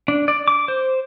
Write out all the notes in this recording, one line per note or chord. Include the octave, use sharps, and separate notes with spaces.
D4
D5
D6
C5